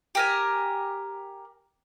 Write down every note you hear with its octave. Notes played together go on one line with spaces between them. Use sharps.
G4 A#4 G#5